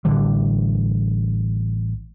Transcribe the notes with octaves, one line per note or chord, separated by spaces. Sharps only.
A1 D3 E3 G3